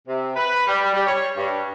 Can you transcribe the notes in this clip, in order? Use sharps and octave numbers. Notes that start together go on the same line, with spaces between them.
C3
B4
G3
G3
C#5
G2